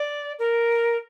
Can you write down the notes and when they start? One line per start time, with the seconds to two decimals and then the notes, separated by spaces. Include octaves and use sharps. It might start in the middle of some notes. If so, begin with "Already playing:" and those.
Already playing: D5
0.39 A#4